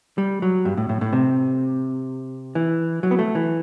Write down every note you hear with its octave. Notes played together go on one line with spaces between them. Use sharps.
G3
F#3
G2
A2
A2
A2
C3
E3
F#3
B3
A3
E3